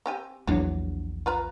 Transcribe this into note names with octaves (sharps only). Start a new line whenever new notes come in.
C4 G4 G#5
A#1 E2 F#3 D4
F4 B4 A#5